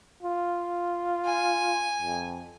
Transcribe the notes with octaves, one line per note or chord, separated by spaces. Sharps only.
F4
G#5
F2